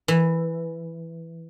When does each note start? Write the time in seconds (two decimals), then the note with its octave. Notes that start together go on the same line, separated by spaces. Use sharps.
0.08 E3